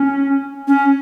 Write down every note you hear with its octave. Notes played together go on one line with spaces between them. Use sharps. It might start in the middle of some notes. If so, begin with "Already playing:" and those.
Already playing: C#4
C#4